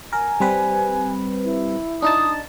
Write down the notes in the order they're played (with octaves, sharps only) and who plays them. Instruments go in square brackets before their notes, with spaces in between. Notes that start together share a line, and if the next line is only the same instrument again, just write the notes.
[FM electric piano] A#4 [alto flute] G#5
[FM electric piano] G3 C4 B4
[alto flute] E4
[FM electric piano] D4 D#4 A5 [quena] D#6